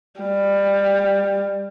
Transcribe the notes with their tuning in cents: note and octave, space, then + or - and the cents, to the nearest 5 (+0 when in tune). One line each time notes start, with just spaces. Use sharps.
G3 +20